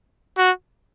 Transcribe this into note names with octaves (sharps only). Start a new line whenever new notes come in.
F#4